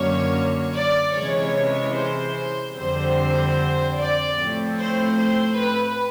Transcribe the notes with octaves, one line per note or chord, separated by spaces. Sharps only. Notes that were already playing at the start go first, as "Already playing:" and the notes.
Already playing: F#2 D3 F#3 A#3 C#4 C#5
D5
C3 E3 G#3 C#4 C#5
C5
F2 D3 G3 C4 C5
D5
A2 F3 A3 C4
C5
C5
B4